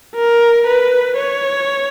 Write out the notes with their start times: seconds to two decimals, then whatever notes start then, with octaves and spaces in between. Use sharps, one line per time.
0.15 A#4
0.67 B4
1.17 C#5